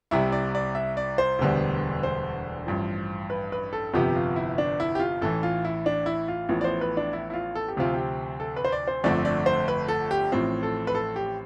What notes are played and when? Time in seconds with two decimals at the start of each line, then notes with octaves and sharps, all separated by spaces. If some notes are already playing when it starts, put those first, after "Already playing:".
0.11 C2 C3 G3 E4
0.32 D5
0.55 D5
0.75 E5
0.97 D5
1.18 C5
1.39 E1 D2 D3 G3 B3
2.03 C5
2.66 A1 G2 F3
3.30 B4
3.52 B4
3.73 A4
3.94 G1 F2 C3 F3 B3 G4
4.16 F4
4.36 E4
4.58 D4
4.80 E4
4.95 G4
5.00 F4
5.21 A1 A2 E3 A4
5.43 F4
5.65 E4
5.86 D4
6.06 E4
6.28 F4
6.49 A1 A2 F3 B3
6.61 D5
6.64 C5
6.81 B4
6.97 D4
7.13 E4
7.30 E4
7.33 F4
7.55 A4
7.68 G4
7.77 D2 C3 F3 C4 F4
7.94 G4
8.40 A4
8.56 B4
8.65 C5
8.72 D5
8.87 C5
9.04 G1 F2 D3 A3 C4 D5
9.25 D5
9.46 C5
9.68 B4
9.88 A4
10.11 G4
10.32 A1 A2 F3 C4
10.63 A4
10.87 B4
10.95 A4
11.16 G4